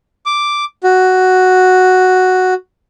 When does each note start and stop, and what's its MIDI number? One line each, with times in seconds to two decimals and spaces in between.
0.26 0.65 86
0.83 2.54 66